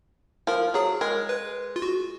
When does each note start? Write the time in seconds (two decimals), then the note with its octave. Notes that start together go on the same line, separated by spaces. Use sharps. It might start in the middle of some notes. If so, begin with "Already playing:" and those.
0.47 F3 A#4
0.74 F#3 G#4
1.01 G#3 A#4
1.29 B4
1.76 F4
1.82 F#4